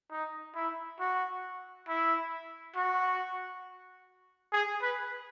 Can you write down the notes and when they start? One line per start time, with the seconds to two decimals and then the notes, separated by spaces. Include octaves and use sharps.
0.11 D#4
0.55 E4
0.99 F#4
1.88 E4
2.76 F#4
4.53 G#4
4.82 B4